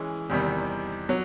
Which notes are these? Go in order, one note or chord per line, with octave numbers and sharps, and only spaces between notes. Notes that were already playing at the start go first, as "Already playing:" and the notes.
Already playing: E3 G#3 C#4
E2 C3 D#3 G3
F#3